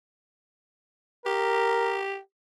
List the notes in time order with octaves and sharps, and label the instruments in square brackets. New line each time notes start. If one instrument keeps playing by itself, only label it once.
[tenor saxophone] G4 [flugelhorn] A#4